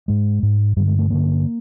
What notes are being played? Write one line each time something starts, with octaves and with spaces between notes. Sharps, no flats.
G#2 G#3
G#2
G2 D3 G3
G#3
A3
G2 D3 A#3